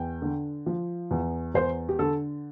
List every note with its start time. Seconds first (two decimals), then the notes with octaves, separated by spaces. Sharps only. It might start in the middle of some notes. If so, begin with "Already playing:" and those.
Already playing: E2 G5
0.22 D3
0.66 F3
1.11 E2
1.54 E2 C5
1.89 G4
1.99 D3 A4